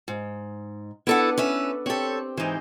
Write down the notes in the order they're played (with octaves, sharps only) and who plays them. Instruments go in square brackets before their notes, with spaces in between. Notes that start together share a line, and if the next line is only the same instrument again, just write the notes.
[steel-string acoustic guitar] G#2
[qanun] B3 D4 [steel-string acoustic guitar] E4 A4 F#5
[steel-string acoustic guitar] C#4 B4 E5 [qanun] A4
[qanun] C4 G4 [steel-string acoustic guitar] A4 C#5
[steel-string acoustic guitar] G#2 E3 [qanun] D#4 C5